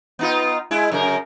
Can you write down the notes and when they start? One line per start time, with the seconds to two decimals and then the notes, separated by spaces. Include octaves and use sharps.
0.19 B3 D#4 F4
0.71 G#3 E4
0.91 F#2 C#3 A#4